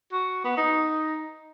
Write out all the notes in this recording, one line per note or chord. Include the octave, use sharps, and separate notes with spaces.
F#4
B3
D#4